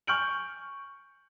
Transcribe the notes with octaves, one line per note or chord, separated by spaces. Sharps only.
G#5 C#6 F6 G6 D7 F#7